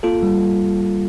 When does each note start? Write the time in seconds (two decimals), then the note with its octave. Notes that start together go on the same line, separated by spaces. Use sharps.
0.03 A#3 F4 A4
0.23 G3